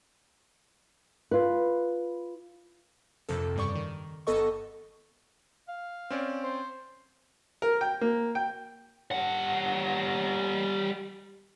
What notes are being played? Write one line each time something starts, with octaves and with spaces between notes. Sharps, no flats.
F4 B4
A#1 F2 C3 F3 C4 A4
G2 C#3 G3 D5 C#6
D#3
G1 B3 A4 D#5 C#6
F5
C4 C#4 D5
C5
A#4
G5
A#3
G5
G3 F#5